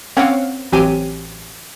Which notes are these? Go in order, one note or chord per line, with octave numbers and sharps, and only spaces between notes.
A#3 C4 C#4 C#5 F5 F#5
A1 F#3 C4 G4 G#5 D#7